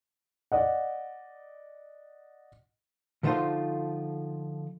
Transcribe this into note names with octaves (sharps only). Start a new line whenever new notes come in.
D5 D#5 F#5
D3 F3 A3 D#4 F4 C5